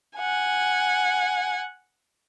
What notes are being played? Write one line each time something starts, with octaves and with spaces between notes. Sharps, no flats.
F#5 G#5